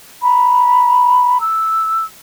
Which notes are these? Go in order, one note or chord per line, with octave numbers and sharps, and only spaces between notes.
A#5 B5
E6